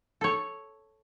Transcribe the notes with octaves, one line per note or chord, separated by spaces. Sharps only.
A4 C#5